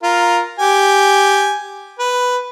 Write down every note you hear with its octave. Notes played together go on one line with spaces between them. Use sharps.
F4 A#4
G4 G#5
B4